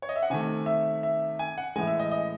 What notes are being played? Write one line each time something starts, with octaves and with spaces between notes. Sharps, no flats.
C#5
D#5
E5
F#5
C3 D#3 A3 G#5
E5
E5
G#5
F#5
A2 E3 G#3 G#5
E5
D#5
D#5